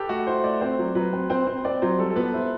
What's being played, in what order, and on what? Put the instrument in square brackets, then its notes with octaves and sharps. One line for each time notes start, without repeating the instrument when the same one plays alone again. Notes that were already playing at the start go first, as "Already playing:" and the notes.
Already playing: [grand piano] G4 A4 B4
[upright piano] A3 [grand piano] F#4
[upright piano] E4 [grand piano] C5
[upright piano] A3 [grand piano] D5
[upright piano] C4 [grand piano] C5
[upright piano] F#3
[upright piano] F#3 [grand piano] B4
[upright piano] C4
[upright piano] C4 [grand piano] C5
[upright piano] C4 [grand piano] C5
[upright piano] C4 [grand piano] D5
[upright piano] F#3 [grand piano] C5
[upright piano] G3 [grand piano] A4
[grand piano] A4
[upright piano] B3 [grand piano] B4
[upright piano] E4 [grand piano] C5